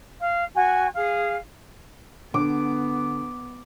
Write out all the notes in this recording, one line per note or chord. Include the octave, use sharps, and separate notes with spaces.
F5
F#4 G#5
G#4 F5
D3 B3 D6